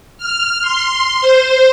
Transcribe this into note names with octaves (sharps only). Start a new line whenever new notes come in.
F6
C6
C5